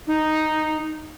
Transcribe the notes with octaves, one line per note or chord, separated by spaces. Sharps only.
D#4